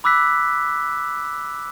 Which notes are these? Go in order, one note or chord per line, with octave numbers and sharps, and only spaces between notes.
B5 D6 E6 F#6 B6